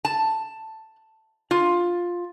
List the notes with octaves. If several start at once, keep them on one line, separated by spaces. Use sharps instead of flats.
A5
F4